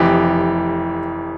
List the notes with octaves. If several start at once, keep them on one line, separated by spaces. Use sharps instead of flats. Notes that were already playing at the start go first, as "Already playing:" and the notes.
Already playing: F1 F2 E3 G4